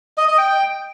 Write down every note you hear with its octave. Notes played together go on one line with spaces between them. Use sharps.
D#5
D#5
G5